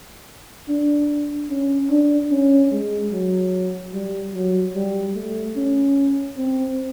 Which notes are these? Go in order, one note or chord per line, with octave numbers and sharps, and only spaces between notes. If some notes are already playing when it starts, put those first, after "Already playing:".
D4
C#4
D4
C#4
G#3
F#3
G3
F#3
G3
A3
C#4
C4